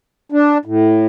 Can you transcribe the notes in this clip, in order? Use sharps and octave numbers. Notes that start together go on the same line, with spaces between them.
D4
A2